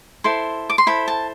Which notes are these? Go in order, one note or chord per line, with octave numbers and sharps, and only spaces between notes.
E4 A4 C5 C6
D6
C6
E4 A4 C5 B5
A5